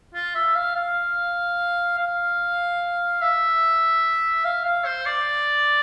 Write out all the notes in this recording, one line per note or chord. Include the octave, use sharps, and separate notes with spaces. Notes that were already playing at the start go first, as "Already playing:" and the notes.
F4
E5
F5
F5
F5
E5
F5
F5
C5
D5